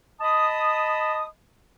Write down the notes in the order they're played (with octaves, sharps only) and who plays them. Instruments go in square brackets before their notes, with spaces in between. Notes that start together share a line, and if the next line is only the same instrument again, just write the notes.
[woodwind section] D#5 A5 B5 D#6